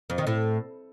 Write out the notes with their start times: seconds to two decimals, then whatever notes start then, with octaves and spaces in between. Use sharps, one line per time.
0.10 F2
0.18 D#3
0.27 A2